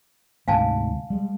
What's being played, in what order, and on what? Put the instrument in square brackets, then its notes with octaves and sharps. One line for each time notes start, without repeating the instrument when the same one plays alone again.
[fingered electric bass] D2 G#2 C3 [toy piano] F5 G#5 A5
[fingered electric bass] G3 G#3